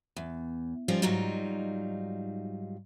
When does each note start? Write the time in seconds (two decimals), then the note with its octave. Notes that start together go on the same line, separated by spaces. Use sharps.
0.16 E2
0.88 F3 G3 C#4 D#4 F4
1.02 G#2 F#3 G3 D#4 F4